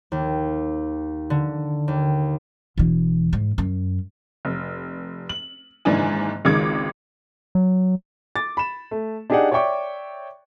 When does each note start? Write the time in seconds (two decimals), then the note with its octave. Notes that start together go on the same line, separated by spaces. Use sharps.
0.12 D#2
1.30 D3
1.88 D#2
2.78 E1 E3
3.33 G#2
3.58 F#2
4.45 F1
5.29 F#7
5.85 F#1 G#2 D#3 E3 D4 G#5
6.45 G#1 C#2 D#3 G#3 D6 G#6
7.55 F#3
8.35 D6 A6
8.57 B5 E7
8.91 A3
9.30 D4 D#4 G4 G#4 D5 F#5
9.52 C#5 D5 E5 G5 C#6 D6